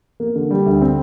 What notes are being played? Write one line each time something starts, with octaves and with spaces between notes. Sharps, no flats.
A#3
D3
G3
D2
C4